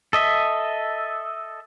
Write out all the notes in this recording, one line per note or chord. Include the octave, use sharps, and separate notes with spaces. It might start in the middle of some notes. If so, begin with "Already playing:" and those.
A4 D#5 E5